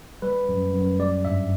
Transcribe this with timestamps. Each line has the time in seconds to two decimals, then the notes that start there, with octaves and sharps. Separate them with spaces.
0.22 G3 B4
0.49 F#2
0.73 F#2
0.99 G3 D5
1.25 G2 E5